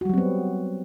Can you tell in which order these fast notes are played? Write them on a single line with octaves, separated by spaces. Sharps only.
F#4 G3 F#3 C4 B3